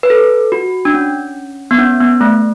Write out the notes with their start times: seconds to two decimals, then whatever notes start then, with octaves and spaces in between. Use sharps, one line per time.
0.03 B4
0.10 A4
0.52 F#4
0.85 D4
0.94 C#4
1.71 B3
1.78 C#4
2.00 B3
2.21 A3